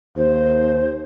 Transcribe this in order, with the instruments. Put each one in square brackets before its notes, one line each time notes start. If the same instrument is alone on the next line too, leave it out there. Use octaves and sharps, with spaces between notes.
[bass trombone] D#2 [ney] C5